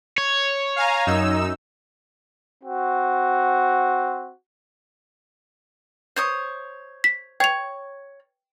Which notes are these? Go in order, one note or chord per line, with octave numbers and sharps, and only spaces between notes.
C#5
F5 G#5 A#5
F#2 D#4 E6
C4 F#4
C5 C#5 D#6
B6
C#5 G5 F7